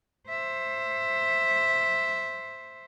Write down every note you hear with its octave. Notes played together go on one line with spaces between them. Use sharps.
C5 E5